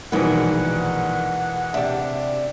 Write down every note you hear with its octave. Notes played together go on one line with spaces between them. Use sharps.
A#1 B2 D#3 E3 G#3 A#4 B4 F#5
C3 D4 G4 D5 E5